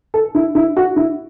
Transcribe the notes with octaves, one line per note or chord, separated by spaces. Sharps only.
A4
E4
E4
F#4
E4